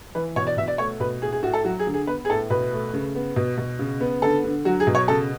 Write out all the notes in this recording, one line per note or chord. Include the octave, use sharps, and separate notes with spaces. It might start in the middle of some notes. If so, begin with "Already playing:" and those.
E3 B4
B2 C#5
D5
B2 E5
D5
A3 C#5
B2 B4
A2 G#4
G#4
A2 F#4
A4
F#3 F#4
G#4
D3
G#4
B3 B4
G#4
A2 A4
B2 B4
A3
C#3
B3
B2
B2
C#3
B3
D3 A4
D3
F#3 F#4
G#4
B2
C#5
C#3 A4